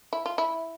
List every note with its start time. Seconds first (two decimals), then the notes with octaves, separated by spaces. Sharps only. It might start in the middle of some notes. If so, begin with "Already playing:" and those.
0.13 E4
0.26 F4
0.38 E4